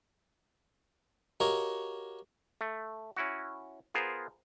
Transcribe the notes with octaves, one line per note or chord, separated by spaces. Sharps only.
F#4 G4 A#4 C#5 D#5 F5
A3
C#4 E4 F#4
B3 F4 G#4 A#4 C5